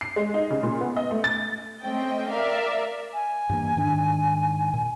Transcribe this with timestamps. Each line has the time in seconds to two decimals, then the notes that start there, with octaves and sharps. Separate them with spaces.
0.01 C7
0.16 G#3
0.34 D#4
0.50 C#3
0.63 A#2
0.81 B3
0.97 D#5
1.11 A3
1.24 A6
1.82 A3 C4 C#4 D#5 G5
2.31 A#4 D5 E5 F5
3.14 G#5
3.49 G2 E3 A#3
3.76 G#2 D#3 D4
4.74 A#2